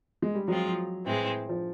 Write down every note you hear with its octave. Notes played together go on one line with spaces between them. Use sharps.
G#3
G3
F3 F#3 G#3 C4 F4
A2 E3 G#3 C4
F3